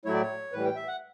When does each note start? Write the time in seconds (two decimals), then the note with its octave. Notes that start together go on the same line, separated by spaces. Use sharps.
0.05 A2 F#3 A3 E4 C#5
0.14 D5
0.22 C#5
0.52 A2 E3 G3 B4
0.64 G5
0.76 E5
0.88 F#5